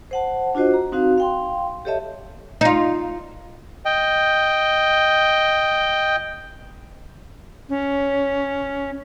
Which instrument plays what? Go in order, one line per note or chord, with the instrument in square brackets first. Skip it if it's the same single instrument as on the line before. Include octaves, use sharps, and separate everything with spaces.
[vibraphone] C5 F#5 A5
D4 F4 F#4 C5 D#5
A#5
C4 D#4 F#4 F5
F5 G5 C6
G4 A4 C#5 D#5 E5 A5
[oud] D#4 F4
[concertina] D#5 G5
[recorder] C#4